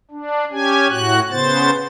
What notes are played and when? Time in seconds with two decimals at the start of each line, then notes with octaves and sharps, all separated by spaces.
0.11 D4
0.52 C#4 G4 G#5
0.89 A2 F#4 F#6
1.31 C#3 B3 C5 A6